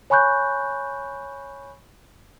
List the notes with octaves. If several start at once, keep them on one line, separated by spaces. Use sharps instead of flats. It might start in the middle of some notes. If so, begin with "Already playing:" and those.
C#5 G#5 B5 C#6 F#6 G6